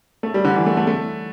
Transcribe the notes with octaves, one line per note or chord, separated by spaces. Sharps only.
A3
G3
D3
E3
A3
A3
A3